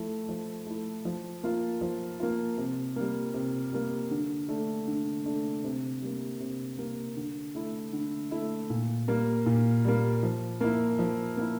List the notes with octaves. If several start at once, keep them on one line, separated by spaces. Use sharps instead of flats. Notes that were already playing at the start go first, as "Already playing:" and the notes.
Already playing: F3 A3 E4
F3
A3 E4
F3
A#3 F4
F3
A#3 F4
C3
G3 A#3
C3
G3 A#3
D3
A3 D4
D3
A3 D4
C3
G3 A#3
C3
G3 A#3
D3
A3 E4
D3
A3 E4
A#2
G3 A#3
A#2
G3 A#3
F3
A#3 E4
F3
A#3 E4